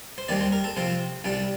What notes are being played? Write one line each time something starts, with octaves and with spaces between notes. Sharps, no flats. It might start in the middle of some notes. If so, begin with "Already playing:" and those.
C5
D#2 D#3 G3 C4 D5
C5
A#4
A4
C3 F3 C4 C5
C2 C3 G3 D4